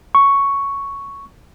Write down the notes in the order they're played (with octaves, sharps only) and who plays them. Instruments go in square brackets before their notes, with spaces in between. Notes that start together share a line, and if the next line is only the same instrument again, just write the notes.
[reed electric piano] C#6